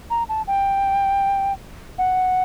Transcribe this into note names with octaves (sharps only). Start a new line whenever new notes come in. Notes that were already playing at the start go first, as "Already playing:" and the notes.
A#5
A5
G5
F#5